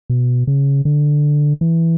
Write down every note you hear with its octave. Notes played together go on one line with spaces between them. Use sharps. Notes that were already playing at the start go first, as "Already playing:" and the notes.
B2
C#3
D3
E3